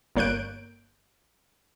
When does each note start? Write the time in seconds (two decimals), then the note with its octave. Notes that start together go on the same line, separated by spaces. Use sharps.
0.16 G1 A#3 C#5 F#6 G6 D7